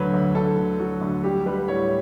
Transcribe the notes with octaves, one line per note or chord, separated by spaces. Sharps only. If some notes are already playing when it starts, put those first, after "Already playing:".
Already playing: D2 D3 F#3 B4 C#5
D2
D2 A4
D3
F#3 F#4
D2
G3 G4
G3 B4
A2 C#5